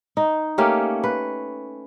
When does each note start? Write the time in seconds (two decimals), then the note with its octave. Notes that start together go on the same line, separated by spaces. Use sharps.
0.17 D#4
0.58 A3 A#3 C#4 G4
1.04 B4